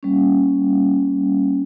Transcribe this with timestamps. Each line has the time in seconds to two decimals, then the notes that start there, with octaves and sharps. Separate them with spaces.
0.03 G3 A#3 C#4